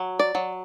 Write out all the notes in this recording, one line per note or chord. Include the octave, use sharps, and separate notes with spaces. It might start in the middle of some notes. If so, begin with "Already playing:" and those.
Already playing: F#3
D5
F#3